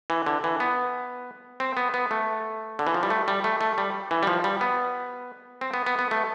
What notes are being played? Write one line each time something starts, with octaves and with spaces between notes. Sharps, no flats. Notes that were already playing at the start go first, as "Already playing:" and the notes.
E3
D3
E3
B3
C4
B3
B3
A3
D3
E3
F3
G3
A3
G3
A3
A3
G3
E3
G3
F3
G3
B3
C4
B3
B3
B3
A3